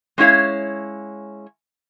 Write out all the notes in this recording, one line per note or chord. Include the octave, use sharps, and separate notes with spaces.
G#3 C#4 E4 F#4 C#5 F5